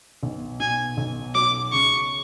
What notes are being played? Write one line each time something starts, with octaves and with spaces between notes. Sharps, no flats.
B1
B2 G#5
B1
F#3 D6
C#2 C#6